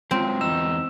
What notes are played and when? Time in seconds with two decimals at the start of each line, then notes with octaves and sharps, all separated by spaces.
0.11 F#3 G#3 C4 F4
0.41 E2 D#4 E6 E7